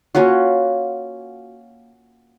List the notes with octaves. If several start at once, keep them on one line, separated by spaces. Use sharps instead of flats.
A#3 C#4 F4 F#4